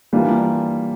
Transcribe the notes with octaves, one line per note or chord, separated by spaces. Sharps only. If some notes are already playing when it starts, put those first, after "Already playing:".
E3 G3 A#3 D4 F4